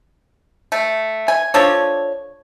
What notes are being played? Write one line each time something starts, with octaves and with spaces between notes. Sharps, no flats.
A3
G#5
F3 D4 A4 C#5